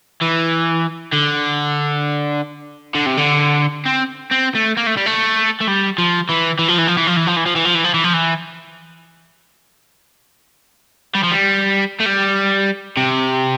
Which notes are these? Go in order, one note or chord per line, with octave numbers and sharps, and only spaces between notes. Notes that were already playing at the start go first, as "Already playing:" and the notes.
E3
D3
D3
C3
D3
C4
C4
A3
A#3
A3
G3
A3
A3
G3
F3
E3
E3
F3
E3
F3
E3
F3
E3
F3
E3
F3
E3
F3
E3
F3
E3
F3
E3
G3
F3
G3
A3
G3
C3